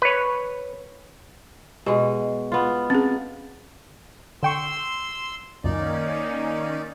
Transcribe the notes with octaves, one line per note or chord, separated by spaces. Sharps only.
B4 C#5
B2 G#3 G4
B3 F4
C4 C#4 G#4
D3 G5 C6 C#6 E6
C#2 F#2 A#2 D#3 A#3 C#4 D#4 D5